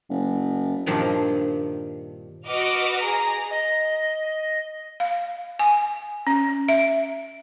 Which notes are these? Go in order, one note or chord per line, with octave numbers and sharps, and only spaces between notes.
F#1
G2 A#2 D#3 F3
F#4 B4 D#5 D6 F6
G#4 A#5
D#5
F5
G#5
C#4
E5